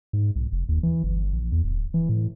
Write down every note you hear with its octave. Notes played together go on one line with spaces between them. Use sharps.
G#2
B1
F1
D#2
E3
G1
A#1
E2
D1
E3
A2